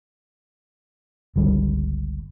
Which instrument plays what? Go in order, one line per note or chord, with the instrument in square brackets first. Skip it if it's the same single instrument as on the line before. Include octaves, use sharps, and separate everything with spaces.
[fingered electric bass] G1 C#2 G3